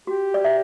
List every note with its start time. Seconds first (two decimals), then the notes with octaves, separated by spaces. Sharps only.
0.07 F#4 G4
0.34 D5
0.45 E5